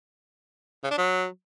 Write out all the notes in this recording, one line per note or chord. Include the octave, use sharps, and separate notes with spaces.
C#3
D4
F#3